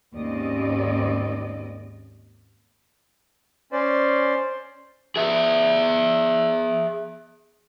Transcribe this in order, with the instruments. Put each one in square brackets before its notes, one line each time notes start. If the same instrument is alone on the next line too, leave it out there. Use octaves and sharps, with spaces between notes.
[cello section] D#2 G#2 C4 C#4 D5 D#5
[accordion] C#4 D5 [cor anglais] C5
[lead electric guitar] G#4 E5